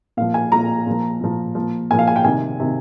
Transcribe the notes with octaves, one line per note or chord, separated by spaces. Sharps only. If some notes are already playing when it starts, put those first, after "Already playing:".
A#2 F3 F5
G#5
A#2 F3 A#5
A#2 F3
A#2 F3
A#2 F3
A#2 F3 G#5
F5
G#5
G5
C3 D#3 G#5
C3 D#3